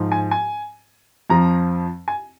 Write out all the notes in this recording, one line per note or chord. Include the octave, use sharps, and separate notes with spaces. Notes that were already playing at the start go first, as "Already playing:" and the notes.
Already playing: G#2 F3
G#5
G#5
F2 F3 A#5
G#5